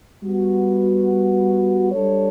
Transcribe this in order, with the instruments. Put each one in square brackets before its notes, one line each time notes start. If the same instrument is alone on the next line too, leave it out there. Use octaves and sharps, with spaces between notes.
[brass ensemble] G3 B3 F#4
G3 D4 A4 C#5